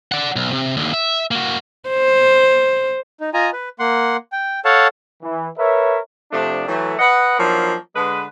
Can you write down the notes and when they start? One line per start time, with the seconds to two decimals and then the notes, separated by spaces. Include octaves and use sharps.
0.12 D5 F#5
0.36 B1
0.53 C3
0.77 D#2 D3
0.93 E5
1.31 A#3 F#4
1.89 C5
3.20 D#4
3.34 F4 D#5 G#5 A#5
3.53 B4
3.79 A#3 F#5 C6
4.32 G5
4.65 A4 C#5 F5 F#5 A5
5.22 E3
5.58 A#4 B4 C#5 E5
6.31 C3 F3 A3 D4
6.68 E3 F#3 A3
6.99 B4 D#5 F#5
7.39 F3 F#3 A#3 D4 D#4
7.96 D3 G#3 B4